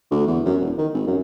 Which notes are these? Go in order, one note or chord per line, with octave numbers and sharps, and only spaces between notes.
D2
E2
F#2
E1
D#3
G#1
F#2